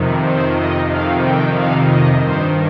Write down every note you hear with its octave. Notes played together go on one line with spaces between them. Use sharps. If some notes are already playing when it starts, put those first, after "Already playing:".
Already playing: F2 C3 D#3
C5
D#5
F2 C3 D#3 F5
G5
F5
D#5
G2 D#3 C5